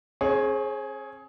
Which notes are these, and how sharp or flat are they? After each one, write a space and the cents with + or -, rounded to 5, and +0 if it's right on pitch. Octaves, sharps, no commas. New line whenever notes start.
C4 +45 G#4 +20 C#5 +0